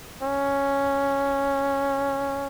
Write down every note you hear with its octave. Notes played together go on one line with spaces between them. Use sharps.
C#4